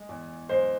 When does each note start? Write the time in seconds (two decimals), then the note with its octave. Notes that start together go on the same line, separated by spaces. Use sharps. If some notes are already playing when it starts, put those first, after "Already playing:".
Already playing: G#3
0.09 E2
0.49 G#3 C5